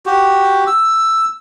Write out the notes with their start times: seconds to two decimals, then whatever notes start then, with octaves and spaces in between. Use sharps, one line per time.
0.06 F#4 G4
0.67 E6